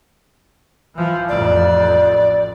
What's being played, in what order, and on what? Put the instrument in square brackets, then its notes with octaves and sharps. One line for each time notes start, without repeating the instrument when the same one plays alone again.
[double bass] E3 F3
[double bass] A1 F2 [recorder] D5